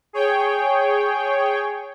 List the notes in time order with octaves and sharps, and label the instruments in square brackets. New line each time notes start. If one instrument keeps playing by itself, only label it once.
[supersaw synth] G#4 C#5 G5